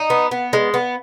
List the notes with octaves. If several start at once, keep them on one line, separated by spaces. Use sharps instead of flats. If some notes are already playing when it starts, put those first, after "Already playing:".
Already playing: D#4
B3
B3
G#3
B3